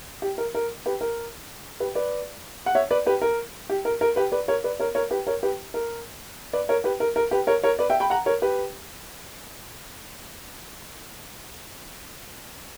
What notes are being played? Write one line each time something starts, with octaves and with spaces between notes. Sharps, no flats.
G4
A#4
A#4
G4 B4
A#4
G4 B4
B4 D5
F#5
C#5 E5
B4 D5
G4 B4
A#4
G4
A#4
A#4
G4 B4
B4 D5
A#4 C#5
B4 D5
A#4 C#5
A#4 C#5
G4 B4
A#4 C#5
G4 B4
A#4
B4 D5
A#4 C#5
G4 B4
A#4
A#4
G4 B4
A#4 C#5
A#4 C#5
B4 D5
E5 G5
G5 B5
F#5 A#5
A#4 C#5
G4 B4